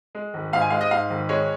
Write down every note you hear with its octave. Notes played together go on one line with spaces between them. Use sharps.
G#3
G#1
G#2 F5
G#5
G#3 F5
D#5
G#2 F5
G#1
G#3 C#5